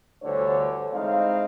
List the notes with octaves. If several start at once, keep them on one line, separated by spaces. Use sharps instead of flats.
D2 G2 D3 E3 C5 C#5
G#3 C4 D#4 E4 F5